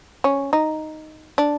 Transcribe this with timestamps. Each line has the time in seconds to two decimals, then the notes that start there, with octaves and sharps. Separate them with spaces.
0.24 C#4
0.53 D#4
1.38 D4